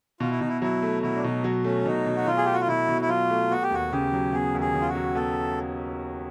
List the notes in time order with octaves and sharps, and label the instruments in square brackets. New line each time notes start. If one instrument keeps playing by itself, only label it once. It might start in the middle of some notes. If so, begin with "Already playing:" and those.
[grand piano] B2 [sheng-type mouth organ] F4
[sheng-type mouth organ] E4
[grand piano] B2 [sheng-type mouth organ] D#4
[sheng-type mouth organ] E4
[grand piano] F#3 [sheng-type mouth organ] E4
[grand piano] A3
[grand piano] B2 [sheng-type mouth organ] E4
[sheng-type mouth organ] D4
[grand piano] B2 [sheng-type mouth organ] D#4
[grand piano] F#3
[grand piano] A3 [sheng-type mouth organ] C#4
[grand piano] B2 [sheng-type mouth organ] D#4
[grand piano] B2
[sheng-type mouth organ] F#4
[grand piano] F#3 [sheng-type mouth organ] F4
[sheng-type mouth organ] G#4
[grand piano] A3 [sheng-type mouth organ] G4
[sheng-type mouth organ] F#4
F4
[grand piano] B2 [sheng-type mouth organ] E4
[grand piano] B2
[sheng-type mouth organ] E4
[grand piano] F#3 [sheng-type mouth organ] F4
[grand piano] A3
[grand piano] B3 [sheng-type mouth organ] F#4
[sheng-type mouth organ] G4
[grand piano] D#2 [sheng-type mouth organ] F#4
[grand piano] C#3 [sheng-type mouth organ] G4
[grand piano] F#3
[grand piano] B3 [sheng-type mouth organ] G#4
[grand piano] D#2
[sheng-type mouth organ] G#4
[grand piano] C#3
[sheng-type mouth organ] F4
F#4
[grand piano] F#3
[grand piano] B3 [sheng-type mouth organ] A4